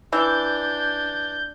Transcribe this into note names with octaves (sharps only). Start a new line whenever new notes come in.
E3 D4 G6